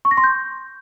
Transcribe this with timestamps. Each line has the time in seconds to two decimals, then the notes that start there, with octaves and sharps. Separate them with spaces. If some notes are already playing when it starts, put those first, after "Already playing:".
0.05 C#6
0.11 A#6
0.17 C6
0.24 G6